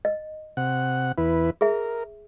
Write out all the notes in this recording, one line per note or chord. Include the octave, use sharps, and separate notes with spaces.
D#5
C3 F#5
E2 E4 B4
G#4 A#4 E5